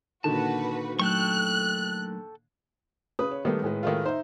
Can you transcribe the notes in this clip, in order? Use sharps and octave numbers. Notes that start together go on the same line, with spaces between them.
A#2 D3 D#3 F#4 B4 A5
F#3 A3 A4 G5 C#6 F#6
C#3 B4 D#6
C#5
D#3 G3 A3 B3
A2 G#3 B4
D#3 A3 F4
D#4 C5 E5